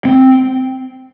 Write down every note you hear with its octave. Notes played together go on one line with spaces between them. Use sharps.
C4